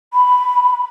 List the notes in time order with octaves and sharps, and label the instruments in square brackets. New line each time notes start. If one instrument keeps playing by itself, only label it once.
[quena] B5